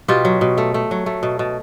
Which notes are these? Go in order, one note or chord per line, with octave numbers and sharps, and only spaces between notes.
B2 F4 G4
F#3
B2
A3
A3
F#3
A3
B2
B2